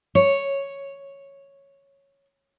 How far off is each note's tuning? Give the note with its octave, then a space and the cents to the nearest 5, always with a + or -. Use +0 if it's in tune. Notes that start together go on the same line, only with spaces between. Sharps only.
C#5 +0